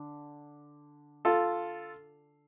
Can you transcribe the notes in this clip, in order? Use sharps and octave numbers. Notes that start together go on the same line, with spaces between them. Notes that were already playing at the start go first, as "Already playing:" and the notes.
Already playing: D3
F4 A4